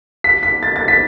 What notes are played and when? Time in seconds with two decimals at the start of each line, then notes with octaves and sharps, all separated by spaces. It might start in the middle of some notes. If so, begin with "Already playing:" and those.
0.24 B6
0.43 B6
0.63 A6
0.76 A6
0.88 B6